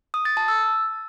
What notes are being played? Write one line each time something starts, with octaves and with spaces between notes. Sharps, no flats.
D#6
A6
A5
E6